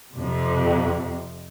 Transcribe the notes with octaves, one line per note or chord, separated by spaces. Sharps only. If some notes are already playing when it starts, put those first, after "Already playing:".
F2 C3